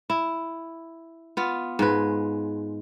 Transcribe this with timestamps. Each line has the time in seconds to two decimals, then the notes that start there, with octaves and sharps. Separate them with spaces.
0.10 E4
1.37 B3 F4
1.79 G#2 G#3 B4